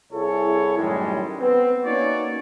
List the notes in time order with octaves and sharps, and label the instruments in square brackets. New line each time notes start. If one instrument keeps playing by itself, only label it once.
[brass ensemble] C2 E4 G#4 A4 C#5
F#2 A2 D#3 G3 G#3
B3 C4
A#3 C#4 D#4 F#4 C#5 D5